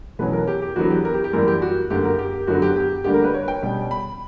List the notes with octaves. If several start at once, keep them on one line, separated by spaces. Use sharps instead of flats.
E2 B2 F#3 C#4 B4
A#4
G4
G4
E2 D3 F#3 B3 F#4
G4
A#4
G4
G4
F#2 E3 G3 A#3 A#4
G4
F#4
F#2 D3 A#3 G4
A#4
G4
F#2 D3 F#3 B3 F#4
G4
G4
D2 D3 G3 A#3 G4
A#4
B4
C#5
G5
B2 G3 C#4
B5